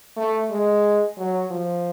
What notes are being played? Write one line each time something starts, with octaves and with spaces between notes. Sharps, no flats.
A3
G#3
F#3
F3